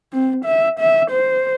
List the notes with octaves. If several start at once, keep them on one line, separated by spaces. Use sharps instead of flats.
C4
E5
E5
C5